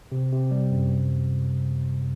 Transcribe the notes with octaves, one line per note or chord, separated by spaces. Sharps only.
C3
C3
G3
F#2
C3